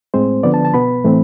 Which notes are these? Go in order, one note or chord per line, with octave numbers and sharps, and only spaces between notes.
A2 G#3 C4 C5
D3 F3 B3 D5
A5
A5
B2 B3 B5
A2 E3 A3 C4